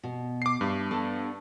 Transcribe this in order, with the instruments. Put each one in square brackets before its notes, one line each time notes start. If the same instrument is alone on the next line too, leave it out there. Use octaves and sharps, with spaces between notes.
[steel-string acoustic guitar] B2
[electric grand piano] D6 C7
[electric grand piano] G2 [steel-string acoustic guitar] D4 E5
[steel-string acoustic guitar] B3 D4 A4